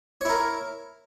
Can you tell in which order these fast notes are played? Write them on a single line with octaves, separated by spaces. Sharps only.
C#5 E4 A#4